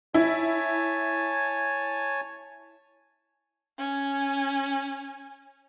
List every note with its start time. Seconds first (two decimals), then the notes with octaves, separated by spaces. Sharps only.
0.14 E4 C#5 G#5 A5
3.78 C#4 G#5